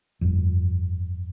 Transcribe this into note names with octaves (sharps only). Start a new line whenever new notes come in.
G1 F2